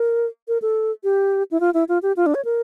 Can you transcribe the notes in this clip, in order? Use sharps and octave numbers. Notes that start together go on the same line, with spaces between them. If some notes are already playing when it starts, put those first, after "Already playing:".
Already playing: A#4
A#4
A4
G4
E4
F4
E4
F4
G4
F4
D4
C#5
A#4